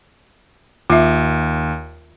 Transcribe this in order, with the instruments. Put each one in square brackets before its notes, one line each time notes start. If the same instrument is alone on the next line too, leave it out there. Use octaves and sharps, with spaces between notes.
[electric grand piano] D#2 [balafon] F4 E5